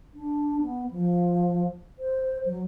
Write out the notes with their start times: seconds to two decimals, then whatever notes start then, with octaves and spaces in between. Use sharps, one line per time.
0.14 D4
0.61 B3
0.91 F3
1.99 C5
2.46 F#3